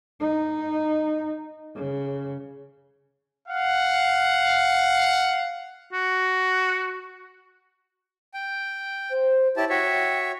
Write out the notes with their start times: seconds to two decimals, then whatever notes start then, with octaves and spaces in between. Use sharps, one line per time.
0.20 D#4
1.75 C#3
3.48 F5 F#5
5.93 F#4
8.34 G5
9.10 C5
9.57 E4 G4 C#5 A5
9.69 F#4 C#5 E5 G5